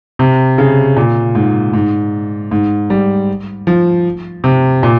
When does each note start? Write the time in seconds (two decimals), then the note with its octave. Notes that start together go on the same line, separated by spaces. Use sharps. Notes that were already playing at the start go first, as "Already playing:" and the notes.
0.19 C3
0.58 C#3
0.97 A#2
1.35 G#2
1.73 G#2
2.51 G#2
2.90 G3
3.67 F3
4.44 C3
4.83 A#2